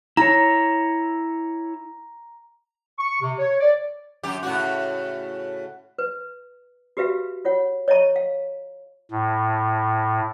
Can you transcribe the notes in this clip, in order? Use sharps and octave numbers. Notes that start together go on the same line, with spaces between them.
E4 C#5 A#5
C#6
C3
C#5
D5
F#2 G4
A2 C#3 F#4
B4
F#4 G4 B4 E5 F5
F4 C#5 F#5
C#5 D#5 E5 A#5 C#6
F5
A2